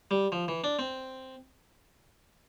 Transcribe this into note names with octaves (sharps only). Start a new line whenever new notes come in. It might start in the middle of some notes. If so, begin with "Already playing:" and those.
G3
F3
E3
D4
C4